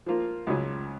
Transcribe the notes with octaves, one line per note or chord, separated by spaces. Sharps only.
F3 A#3 F4
C#2 C#3 F#3 C#4